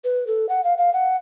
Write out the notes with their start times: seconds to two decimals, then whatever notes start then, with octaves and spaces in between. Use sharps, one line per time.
0.04 B4
0.27 A4
0.49 F#5
0.64 F5
0.78 F5
0.93 F#5